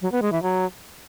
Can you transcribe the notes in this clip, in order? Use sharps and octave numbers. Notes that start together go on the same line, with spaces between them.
F#3
B3
G#3
E3
F#3